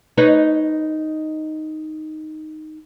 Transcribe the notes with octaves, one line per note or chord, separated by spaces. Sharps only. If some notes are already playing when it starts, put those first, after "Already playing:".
D#4 B4 C#5